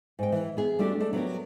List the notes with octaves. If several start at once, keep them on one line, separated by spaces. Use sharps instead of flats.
G#2 G5
E3
B3 G#4
G3 A3 D4 F#4 G4
A3 D4
F#3 B3 G4 A#4